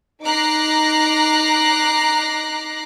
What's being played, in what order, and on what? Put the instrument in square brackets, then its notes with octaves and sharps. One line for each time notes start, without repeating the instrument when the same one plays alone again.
[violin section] D#4 A#5 D6 F#6 A#6 C7